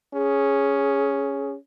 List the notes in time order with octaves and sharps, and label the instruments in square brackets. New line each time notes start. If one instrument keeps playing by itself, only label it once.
[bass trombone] C#4 [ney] G#4